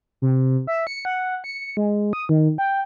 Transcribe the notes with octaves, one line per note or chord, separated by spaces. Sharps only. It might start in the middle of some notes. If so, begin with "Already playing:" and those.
C3
E5
C#7
F#5
C#7
G#3
D#6
D#3
G5